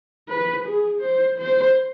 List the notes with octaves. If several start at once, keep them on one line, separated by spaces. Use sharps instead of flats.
B4
G#4
C5
C5